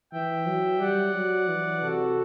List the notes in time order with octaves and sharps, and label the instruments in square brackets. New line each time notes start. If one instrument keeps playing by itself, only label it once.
[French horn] E3 [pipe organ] E5 G5
[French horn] F#3
[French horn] G3 [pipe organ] D5 F#5
[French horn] F#3
E3
[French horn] C3 [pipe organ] F#4 A4